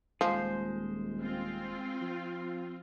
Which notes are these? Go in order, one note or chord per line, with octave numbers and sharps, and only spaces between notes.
D#1 F3 G#3 C5
C4 F4
F3